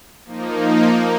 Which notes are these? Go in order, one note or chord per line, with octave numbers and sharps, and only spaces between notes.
F3 A#3 D#4
A#3